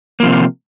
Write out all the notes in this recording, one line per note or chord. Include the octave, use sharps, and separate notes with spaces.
C3 F3 A#3